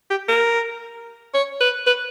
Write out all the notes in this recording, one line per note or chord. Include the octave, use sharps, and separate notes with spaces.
G4
A#4
C#5
B4
B4